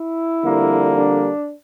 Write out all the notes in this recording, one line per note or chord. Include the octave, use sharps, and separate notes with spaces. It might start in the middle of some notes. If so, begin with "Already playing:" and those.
Already playing: E4
F2 D3 G3 A#3
D4